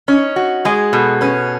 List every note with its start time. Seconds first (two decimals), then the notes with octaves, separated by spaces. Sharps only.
0.08 C#4 D#4
0.36 F#4
0.65 G#3 G#4
0.93 B2 A4
1.21 C#4 B4